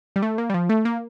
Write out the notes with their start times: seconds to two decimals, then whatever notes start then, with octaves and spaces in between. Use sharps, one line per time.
0.16 G3
0.22 A3
0.38 A#3
0.50 G3
0.54 F3
0.69 A3
0.85 A#3